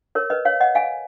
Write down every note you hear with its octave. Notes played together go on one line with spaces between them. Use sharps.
A#4 C#5
B4 D#5
C#5 F5
D#5 F#5
F5 G#5